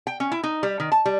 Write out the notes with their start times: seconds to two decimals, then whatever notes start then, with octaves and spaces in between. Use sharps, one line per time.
0.07 G5
0.20 C#4
0.32 E4
0.43 D#4
0.63 G3
0.80 D#3
0.92 A5
1.06 G3